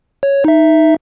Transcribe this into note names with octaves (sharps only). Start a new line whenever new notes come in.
C#5
D#4 E5